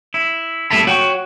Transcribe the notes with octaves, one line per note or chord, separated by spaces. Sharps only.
E4
C2 A3 E4 A5 B5
F#4 C#5 G5